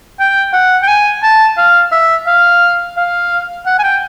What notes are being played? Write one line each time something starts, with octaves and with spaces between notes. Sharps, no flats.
G5
F#5
G5
G#5
A5
F5
E5
F5
F5
F#5
G#5
G5